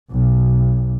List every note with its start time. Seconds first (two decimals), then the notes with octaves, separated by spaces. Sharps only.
0.10 B1